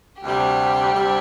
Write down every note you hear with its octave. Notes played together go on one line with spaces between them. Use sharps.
D2 C3 G3 G4
D2 C3 G3